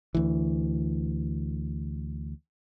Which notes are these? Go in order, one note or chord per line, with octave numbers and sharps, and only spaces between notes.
D2 E3